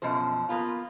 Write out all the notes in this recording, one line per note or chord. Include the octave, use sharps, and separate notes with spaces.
F#2 B2 F3 C5
A#3 B3 F4